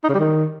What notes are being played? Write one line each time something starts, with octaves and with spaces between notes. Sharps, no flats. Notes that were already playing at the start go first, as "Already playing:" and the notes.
D#4
C#3
G3
D#3